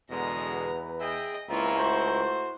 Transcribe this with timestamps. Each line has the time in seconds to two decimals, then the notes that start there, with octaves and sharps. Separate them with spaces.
0.11 E2 B2 D3 G#3 A#5
0.55 B4
1.01 G#4 D#5 E5 G5
1.50 C#2 A#3 C4 E4 F4 A#5 C#6
1.79 A3 F#4 C5